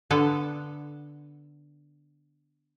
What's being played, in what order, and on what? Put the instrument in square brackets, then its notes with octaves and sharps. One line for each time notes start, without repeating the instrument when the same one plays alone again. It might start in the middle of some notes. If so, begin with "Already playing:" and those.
[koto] D3 B3 A4